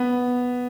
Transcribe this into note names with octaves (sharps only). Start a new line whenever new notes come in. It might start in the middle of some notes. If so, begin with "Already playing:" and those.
Already playing: B3